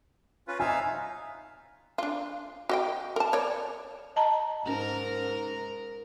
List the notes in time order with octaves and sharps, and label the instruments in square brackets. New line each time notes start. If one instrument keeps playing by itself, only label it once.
[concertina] C#4 F4 B4
[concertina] D#4 E5 F5 [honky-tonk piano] G#5
[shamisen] D4 F4
F#4 D#5 G5
A#4 A5
C#5 D5
[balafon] D#5 A5 A#5
[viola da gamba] G#2 A#4 [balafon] C#4